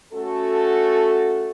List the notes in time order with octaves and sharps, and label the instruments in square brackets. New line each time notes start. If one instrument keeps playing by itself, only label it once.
[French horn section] A3 C#4 F#4 A4